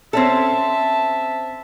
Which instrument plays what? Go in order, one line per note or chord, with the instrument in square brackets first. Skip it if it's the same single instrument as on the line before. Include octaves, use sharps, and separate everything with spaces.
[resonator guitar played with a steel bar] C4 C#4 A4 [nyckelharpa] E5 A5